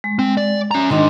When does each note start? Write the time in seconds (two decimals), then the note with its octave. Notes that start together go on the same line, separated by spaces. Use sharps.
0.04 G#3
0.19 C4
0.37 D5
0.71 C#4 A#5
0.90 G#2 D#3 D4 D#5 C6